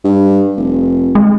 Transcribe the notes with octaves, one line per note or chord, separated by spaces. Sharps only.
G2
F1
G#3